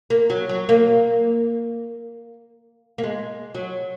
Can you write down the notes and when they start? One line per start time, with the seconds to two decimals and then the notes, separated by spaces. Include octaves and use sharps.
0.10 A#3
0.30 F#3
0.49 F#3
0.69 A#3
2.98 A#3
3.03 G#3
3.55 F#3